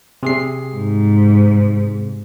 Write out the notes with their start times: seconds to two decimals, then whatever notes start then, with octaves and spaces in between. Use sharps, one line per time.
0.23 C3 G#4 C7
0.75 G#2